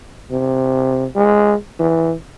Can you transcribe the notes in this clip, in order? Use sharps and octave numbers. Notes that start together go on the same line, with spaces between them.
C3
G#3
E3